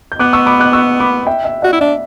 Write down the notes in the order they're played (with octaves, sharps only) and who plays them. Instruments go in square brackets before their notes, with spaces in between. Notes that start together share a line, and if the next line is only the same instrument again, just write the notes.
[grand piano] G6
[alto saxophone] B3 [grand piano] D6 F#6
[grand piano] C#6 E6
B5 D6
D6 F#6
C#6 E6
B5 D6
E5 G5
E5 G5
[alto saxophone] F#4 [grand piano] D5 F#5
[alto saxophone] E4
[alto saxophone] D4 [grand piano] E5